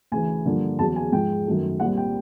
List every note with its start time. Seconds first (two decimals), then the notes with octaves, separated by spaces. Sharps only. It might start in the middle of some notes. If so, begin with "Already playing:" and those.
0.12 D2 C#3 E3 G#5
0.46 G2 D3 F3 A#3
0.79 E2 C#3 F#3 A5
0.96 G#5
1.12 G#2 F3 G#3 G5
1.46 F#2 D#3 F#3 A3
1.80 C2 A#2 G3 C4 F#5
1.97 G5